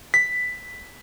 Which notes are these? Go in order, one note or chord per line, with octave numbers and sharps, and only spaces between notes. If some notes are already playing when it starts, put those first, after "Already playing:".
B6